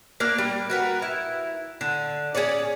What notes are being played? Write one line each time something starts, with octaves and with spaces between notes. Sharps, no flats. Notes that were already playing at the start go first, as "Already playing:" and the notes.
A#3 D4 F5
G3
F#4 A#4 B4
E4
D3
C#4 G#4 C#5 D5